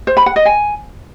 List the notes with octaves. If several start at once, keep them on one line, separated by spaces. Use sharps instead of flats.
C5
B5
F#5
D#5
G#5